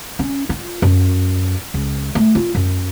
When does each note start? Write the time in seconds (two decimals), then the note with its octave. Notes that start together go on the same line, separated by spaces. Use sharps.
0.19 C#4
0.49 F4
0.82 F#2
1.74 C#2
2.15 A3
2.35 F4
2.55 F#2